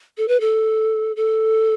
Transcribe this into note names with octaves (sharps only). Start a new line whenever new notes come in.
A4
B4
A4
A4